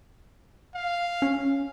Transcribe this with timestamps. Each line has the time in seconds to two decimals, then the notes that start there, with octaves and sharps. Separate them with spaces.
0.75 F5
1.22 C#4